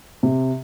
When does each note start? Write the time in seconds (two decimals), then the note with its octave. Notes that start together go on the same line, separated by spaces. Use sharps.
0.23 C3